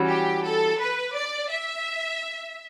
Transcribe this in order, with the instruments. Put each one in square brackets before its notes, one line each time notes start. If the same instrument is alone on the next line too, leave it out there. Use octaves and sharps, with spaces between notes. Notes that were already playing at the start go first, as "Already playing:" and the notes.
Already playing: [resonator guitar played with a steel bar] E3 G3 C#4 F#4
[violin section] G4
A4
B4
D5
E5